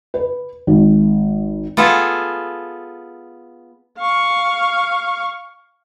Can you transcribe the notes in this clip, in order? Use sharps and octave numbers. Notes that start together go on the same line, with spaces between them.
B4
G#1
B3 F4 G#4 A4
F5 C#6